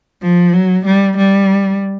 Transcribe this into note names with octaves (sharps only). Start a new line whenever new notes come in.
F3
F#3
G3
G3